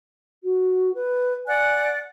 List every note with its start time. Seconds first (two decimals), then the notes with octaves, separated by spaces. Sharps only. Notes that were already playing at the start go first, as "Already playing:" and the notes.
0.44 F#4
0.94 B4
1.47 D5 F#5 G#5 F#6